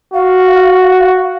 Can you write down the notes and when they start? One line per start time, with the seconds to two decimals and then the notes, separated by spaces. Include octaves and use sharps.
0.14 F#4 F5